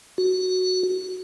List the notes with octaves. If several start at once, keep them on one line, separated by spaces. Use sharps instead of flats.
F#4